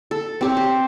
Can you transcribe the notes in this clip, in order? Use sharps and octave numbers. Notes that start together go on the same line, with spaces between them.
A4
C4 G4 C#5
C5